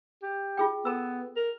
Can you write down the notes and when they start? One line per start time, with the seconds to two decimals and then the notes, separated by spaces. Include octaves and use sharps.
0.22 G4
0.57 F4 G#4 G5
0.85 B3 A4 A#5 E6
1.36 A#4